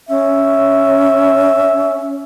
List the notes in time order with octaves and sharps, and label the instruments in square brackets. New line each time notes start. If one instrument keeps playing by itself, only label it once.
[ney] C#4 [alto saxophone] E5